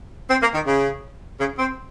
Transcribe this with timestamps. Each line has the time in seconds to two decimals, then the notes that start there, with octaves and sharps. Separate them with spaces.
0.30 C4
0.42 A#3
0.54 D#3
0.66 C#3
1.40 C#3
1.58 C4